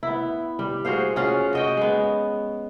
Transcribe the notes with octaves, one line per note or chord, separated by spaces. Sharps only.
B3 E4
G3
F#4 G#4 C5 F5
C#4 F4 F#4 G#4
F#4 D#5 G5
G#3 B3